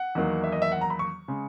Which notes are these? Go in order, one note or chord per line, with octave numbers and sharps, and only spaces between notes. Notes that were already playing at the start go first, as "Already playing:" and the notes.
Already playing: F#5
E2 D#3 F#3 A#3
E5
D#5
E5
F#5
A#5
B5
C#6
C#3 G#3